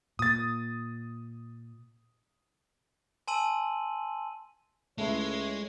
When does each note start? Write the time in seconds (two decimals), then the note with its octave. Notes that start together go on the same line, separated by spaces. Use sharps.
0.19 A#2 D#6 A6
3.28 G#5 A5 C6 E6 D#7 F#7
4.98 C#2 G#3 A3 E4 C#5